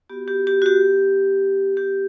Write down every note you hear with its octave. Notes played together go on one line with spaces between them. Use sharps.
B3 F#4 G4
G4
G4
F#4
G4
G4